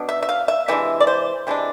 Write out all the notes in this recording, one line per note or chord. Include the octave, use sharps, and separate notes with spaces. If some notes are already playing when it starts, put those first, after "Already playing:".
Already playing: B2 B3 D4
E5
E5
F5
E5
C3 E3 G#3 D4 E5
D5
C5
C3 E3 G#3 D4